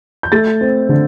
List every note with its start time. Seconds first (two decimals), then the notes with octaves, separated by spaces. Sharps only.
0.23 G6
0.32 A3 A6
0.61 C4
0.89 D3